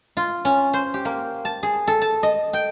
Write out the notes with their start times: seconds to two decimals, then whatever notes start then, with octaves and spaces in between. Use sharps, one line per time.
0.17 F4
0.45 C#4
0.73 C5
0.94 G4
1.05 A#3
1.45 A5
1.63 G#4
1.87 A4
2.02 A5
2.23 D#5
2.53 G5